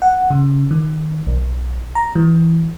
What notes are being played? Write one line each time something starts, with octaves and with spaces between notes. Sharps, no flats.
F#5
C#3
D#3
B1
A#5
E3